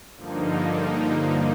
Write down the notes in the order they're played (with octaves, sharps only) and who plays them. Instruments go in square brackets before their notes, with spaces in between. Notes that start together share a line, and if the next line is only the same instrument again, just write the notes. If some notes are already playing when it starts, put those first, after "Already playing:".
[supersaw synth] G2 D3 F3 A#3 D#4